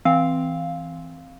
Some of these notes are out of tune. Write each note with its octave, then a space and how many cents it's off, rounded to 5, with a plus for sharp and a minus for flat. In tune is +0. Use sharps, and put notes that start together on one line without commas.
E3 -10 C4 +0 F5 +0